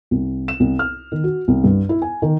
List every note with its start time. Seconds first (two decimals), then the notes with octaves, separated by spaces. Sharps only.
0.11 C2
0.48 E7
0.60 C2
0.79 F6
1.12 D#3
1.24 F#4
1.48 C2
1.64 G2
1.89 E4
2.02 G#5
2.22 D#3